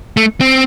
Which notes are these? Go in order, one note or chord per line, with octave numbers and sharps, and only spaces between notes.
A3
C4